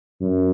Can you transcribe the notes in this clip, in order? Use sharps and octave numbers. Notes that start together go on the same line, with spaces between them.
F#2